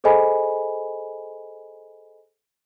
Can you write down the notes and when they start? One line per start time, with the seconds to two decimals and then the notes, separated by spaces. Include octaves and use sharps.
0.04 G#4 A4 C5 D#5 G#5 B5